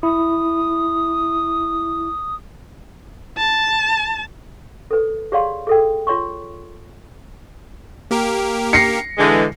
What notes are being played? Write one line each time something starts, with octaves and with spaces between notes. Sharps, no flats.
E4 D#6
A5
A4 B4
G4 G#4 C#5 D5 F5 C6
G#4 A4 G5
F4 C#5 C6 C#6
A#3 G4 A#4
A#6 C7 C#7
D3 E3 G#3